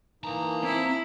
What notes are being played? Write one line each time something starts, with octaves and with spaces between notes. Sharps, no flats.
E3 A#3 D#4 A5 A#5
C4 E4